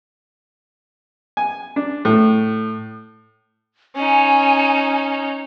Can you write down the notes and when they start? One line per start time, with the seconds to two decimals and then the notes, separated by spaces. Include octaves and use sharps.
1.37 G#5
1.76 D4
2.05 A2
3.96 C#4 D#4 G#5